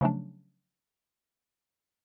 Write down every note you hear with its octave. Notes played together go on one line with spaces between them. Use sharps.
C#3 F3 F#3 A3 C#4 D4